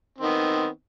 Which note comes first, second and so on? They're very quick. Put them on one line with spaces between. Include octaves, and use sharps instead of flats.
C4 D#3 B3